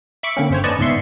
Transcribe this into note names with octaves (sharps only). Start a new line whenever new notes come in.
E5 B5 C#6 D6
D3 A#3 C4 C#4
G1 C5 C#5
B4 D5 D#5 G#5 A5 C#6
C#2 G#2 B3 E5 C6 C#6